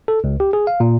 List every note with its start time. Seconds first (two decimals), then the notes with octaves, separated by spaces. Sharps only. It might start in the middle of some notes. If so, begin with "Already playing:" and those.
0.08 A4
0.24 C#2
0.40 G4
0.53 G#4
0.67 F5
0.80 A#2